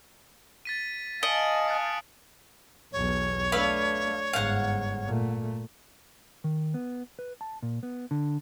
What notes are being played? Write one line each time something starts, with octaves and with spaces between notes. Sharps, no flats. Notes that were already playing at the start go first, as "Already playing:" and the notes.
A6 B6 D#7
D#5 F5 G#5 A5 C#7 D7 F#7
D#6 F#6
B1 E2 C#5
A3 D4 B4 F5 E6
G1 G#2 F5 F#5
A#2 A3
D#3
B3
B4
A5
A#2
B3
D3